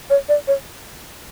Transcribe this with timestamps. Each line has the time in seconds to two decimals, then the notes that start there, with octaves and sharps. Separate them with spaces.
0.10 C#5
0.29 D5
0.48 C#5